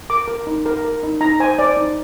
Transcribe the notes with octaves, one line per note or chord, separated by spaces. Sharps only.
A#4 D6
A#4
D#4
A#4
A#4
D#4
D#4 A#5
C5 G#5
C5 D5
D#4